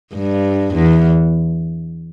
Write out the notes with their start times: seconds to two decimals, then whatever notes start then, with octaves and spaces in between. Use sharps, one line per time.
0.15 G2
0.75 E2